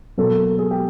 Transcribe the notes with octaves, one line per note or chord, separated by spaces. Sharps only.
B2 F#3 A#3 A4
G#4
G4